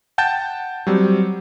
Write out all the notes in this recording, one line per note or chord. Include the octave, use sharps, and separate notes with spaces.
F#5 G5 A5 G6 A6 E7
F#3 G3 C4